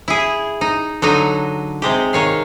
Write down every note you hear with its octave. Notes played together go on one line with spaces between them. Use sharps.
E4 G#4
D#4
D3 F#3 D#4
C3 G#3 G4
D#3 C#5 F5